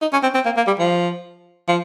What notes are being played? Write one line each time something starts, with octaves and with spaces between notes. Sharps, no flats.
D#4
C#4
C4
C4
A#3
A#3
G3
F3
F3